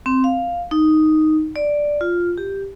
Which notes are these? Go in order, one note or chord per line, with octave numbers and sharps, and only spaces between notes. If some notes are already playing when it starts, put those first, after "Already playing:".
C4
F5
D#4
D5
F4
G4